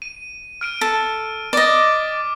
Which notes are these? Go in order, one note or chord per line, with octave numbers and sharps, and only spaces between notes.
D#7
F6 D7 D#7
A4
D5 D#5 D6